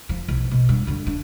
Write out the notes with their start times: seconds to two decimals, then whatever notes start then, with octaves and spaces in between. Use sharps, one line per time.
0.09 F3
0.28 B1
0.51 B2
0.69 G2
0.87 D3 F#3
1.07 D4